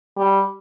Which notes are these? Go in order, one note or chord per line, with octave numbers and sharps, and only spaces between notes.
G3